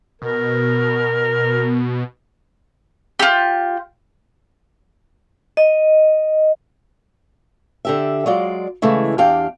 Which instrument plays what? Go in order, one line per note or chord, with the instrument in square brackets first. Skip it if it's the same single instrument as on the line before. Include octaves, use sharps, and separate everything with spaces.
[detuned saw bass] B2 [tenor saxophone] A#4
[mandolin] F4 G4
[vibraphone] D#5
[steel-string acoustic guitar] D3 G4 E5
F#3 G#3 F4 D5
C#3 E3 G#3 A3 E4
E2 D4 G4 F5 G5